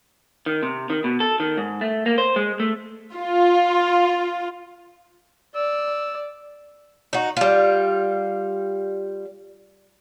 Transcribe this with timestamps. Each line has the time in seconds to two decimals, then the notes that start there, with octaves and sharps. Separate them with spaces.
0.46 D#3
0.63 C3
0.90 D#3
1.04 B2
1.20 A4
1.40 D#3
1.57 G#2
1.81 A3
2.06 A#3
2.18 C5
2.36 G#3
2.60 A3
3.16 F4
5.55 D5 E6
7.13 D#4 F#4
7.37 G3 F4